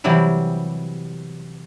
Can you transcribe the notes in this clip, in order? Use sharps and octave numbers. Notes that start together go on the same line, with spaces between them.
C3 E3 F#3 G3 E4